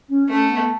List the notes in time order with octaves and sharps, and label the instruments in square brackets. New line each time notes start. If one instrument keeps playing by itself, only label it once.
[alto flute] C#4
[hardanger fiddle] A3 [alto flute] C#4
[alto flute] B3